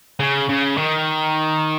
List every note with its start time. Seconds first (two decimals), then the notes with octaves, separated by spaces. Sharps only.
0.20 C#3
0.49 C#3
0.78 D#3